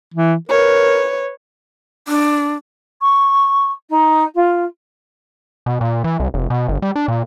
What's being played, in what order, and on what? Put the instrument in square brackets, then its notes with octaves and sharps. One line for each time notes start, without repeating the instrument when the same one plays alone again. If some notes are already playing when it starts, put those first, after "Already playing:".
[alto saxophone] E3
[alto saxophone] A#4 [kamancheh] B4 C#5
[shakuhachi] D4
[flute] C#6
D#4
F4
[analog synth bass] B2
A#2
E3
C2
F1
B2
G1
G3
D4
A#2